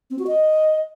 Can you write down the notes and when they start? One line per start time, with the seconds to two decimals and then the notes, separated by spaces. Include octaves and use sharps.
0.10 C4
0.19 F#4
0.27 D#5